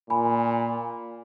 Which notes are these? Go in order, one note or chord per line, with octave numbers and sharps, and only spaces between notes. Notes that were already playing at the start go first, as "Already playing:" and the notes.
A#2 G#5 B5